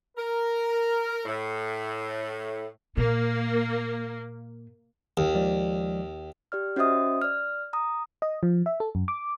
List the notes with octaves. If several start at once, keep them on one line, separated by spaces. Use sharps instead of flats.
A#4
A2
A#2 A#3
D#2
F3 G#3 D5
G4 D5 F6
C#4 F#4 C5 D#5 E5 D#6
D5 F6
A#5 D#6
D#5
F3
E5
A4
F#2
D6